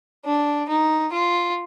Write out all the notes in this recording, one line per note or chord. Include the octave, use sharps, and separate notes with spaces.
D4
D#4
F4